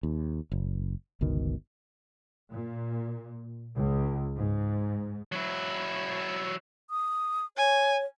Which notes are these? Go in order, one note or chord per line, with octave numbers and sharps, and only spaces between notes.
D#2
F#1
G1 C#2 B2 D#3
A#2
C#2
G#2
F#3 E4
D#6
C#5 G#5